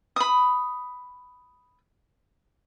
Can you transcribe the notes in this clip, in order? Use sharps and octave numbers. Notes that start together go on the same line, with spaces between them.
B5 D#6